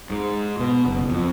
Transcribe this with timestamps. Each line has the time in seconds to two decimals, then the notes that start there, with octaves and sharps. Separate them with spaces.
0.10 G#2
0.60 B2
0.86 F#1
1.10 F2